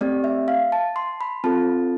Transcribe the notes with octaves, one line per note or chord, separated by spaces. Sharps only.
A3 C4 G4 D5
E5
F5
A5
C6
B5
C4 F4 A4 A5